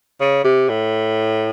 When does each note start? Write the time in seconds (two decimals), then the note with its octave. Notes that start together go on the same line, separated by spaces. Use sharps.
0.21 C#3
0.44 C3
0.69 A2